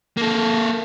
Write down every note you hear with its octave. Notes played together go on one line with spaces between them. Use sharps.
A#3 A4